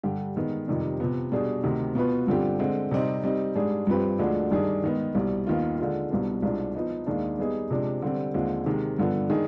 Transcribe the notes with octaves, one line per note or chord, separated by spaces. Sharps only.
G2 D3 G3 D4 G4
G#2 D#3 G#3 B3
F2 C3 D#3 G3
C3 F3 B3
B2 G3 D4 G#4
D2 C3 D#3
B2 B3 F4 B4
G2 D3 F3 C4 G4
D3 G#3 C4
C3 G3 C4 D#4
G3 C4 D#4
G#2 G3 D4 G#4
G2 F3 C4 G4 B4
D2 D3 F3 G#3 D4
G2 D#3 G3 D4 G#4
G#2 D#3 B3 D#4
C2 B2 G3
D#2 D#3 B3 F4
D3 G#3 D4 F4
C2 B2 G3 B3 D4
C2 B2 G#3 D4 F4
F3 B3 D#4
D#2 D#3 G#3 D4
G3 B3 D#4 G#4
C3 F3 G#3 D4
D3 G3 C4
D#2 D3 F3 G#3 C4
C3 D#3 G#3
G2 D3 F3 B3
D#3 G#3 D4 G#4